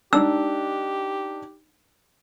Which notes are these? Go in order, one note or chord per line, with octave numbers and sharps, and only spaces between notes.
D4 D#4 G4 E6